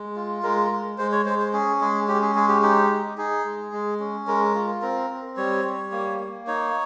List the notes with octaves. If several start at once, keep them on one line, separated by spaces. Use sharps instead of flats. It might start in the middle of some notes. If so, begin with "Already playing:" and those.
Already playing: G#3
F4
G#3 A#4
G#3
G#3 C5
C#5
G#3 C5
C5
C#4 G#4
G#3 G#4
C#4 G4
G#4
G#3 G#4
G4
D#4 G4
D#4
D#4 G#4
G#3
G#3
C#4
G#3 A#4
F4
C4 A#4
C4
G3 C#5
G3
A#3
A#3
D#4 C#5